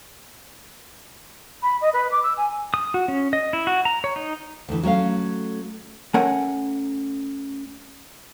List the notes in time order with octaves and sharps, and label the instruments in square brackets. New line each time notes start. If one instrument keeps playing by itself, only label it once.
[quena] B5
D#5
B4
D6
E6
G#5
[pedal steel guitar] D#6
F#4
C#4
D#5
E4
F#4
A#5
C#5
D#4
[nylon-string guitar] D2 E3
F#3 A3 C#4 F5
[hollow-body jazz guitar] A3 C#4 A#4 F#5 G#5